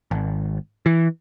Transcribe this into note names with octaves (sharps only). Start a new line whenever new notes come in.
G#1
E3